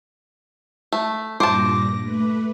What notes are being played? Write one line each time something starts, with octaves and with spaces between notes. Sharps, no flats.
A3
G2 A#2 C5 A5 D6 A#6
A3 B4